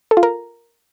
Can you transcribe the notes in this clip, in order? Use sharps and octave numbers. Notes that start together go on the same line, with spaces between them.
A4
F4
A#4